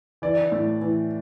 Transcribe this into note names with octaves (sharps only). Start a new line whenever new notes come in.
E3 D5
A2
E3